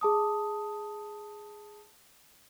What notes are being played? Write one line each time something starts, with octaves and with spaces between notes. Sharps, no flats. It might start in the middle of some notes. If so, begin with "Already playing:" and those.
G#4 A5 D#6